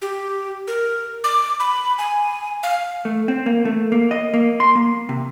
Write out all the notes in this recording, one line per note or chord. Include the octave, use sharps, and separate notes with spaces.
G4
A#4
D6
B5
G#5
F5
A3
C4
A#3
A3
A#3
D#5
A#3
C6
A#3
C3